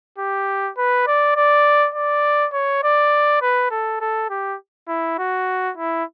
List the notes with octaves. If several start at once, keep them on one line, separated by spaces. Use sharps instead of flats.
G4
B4
D5
D5
D5
C#5
D5
B4
A4
A4
G4
E4
F#4
E4